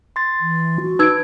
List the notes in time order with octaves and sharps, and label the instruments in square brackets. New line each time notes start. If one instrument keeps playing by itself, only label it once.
[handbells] C6 A6
[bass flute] E3
F#4
[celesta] D#4 E6 G#6 [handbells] B4 D7